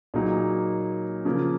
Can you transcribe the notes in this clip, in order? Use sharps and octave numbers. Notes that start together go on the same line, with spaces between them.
A#2 F#3 A#3 D#4 G#4
C#3 F3 A#3